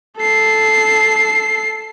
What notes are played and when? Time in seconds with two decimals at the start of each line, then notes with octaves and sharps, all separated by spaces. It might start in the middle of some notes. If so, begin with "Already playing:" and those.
0.18 A4 C7